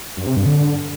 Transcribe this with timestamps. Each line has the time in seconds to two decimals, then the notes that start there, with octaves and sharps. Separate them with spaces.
0.17 F#2
0.27 C3
0.36 G2
0.46 D3